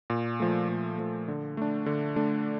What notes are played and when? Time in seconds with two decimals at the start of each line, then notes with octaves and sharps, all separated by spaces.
0.10 A#2
0.40 F3 A3
0.69 A#2
0.98 F3 A3
1.28 D3
1.57 A3 D4
1.86 D3
2.16 A3 D4